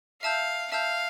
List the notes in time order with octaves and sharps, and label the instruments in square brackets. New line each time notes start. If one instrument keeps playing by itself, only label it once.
[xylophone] E5 A5 E6 G6 [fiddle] F5
[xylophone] E5 A5 E6 G6 [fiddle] F5